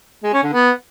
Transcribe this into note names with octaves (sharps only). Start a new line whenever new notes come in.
G#3
C#4
D3
B3